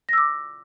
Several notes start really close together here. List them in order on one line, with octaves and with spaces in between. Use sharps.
A#6 E6 D6